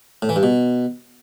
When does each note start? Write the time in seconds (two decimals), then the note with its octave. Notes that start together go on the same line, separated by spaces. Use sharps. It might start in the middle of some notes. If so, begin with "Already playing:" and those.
0.22 A2
0.29 E3
0.36 G2
0.43 B2